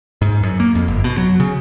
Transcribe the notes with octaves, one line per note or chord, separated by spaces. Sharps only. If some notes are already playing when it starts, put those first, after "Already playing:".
G#2
F#2
A#3
F2
G1
B2
F#3
C#3